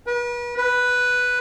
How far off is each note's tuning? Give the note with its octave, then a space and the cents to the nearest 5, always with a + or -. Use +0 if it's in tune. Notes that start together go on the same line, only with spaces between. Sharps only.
B4 -40
B4 +0